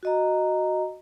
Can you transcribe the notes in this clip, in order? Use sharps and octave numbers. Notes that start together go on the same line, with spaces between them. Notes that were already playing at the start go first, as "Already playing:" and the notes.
F#4 D#5 A#5